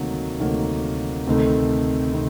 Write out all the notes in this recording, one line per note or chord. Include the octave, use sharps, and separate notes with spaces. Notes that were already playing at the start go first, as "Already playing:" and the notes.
Already playing: D2 C3 D#3 F#3 A#3
D2 C3 D#3 F#3 A#3
D2 C3 D#3 A3
C3 D#3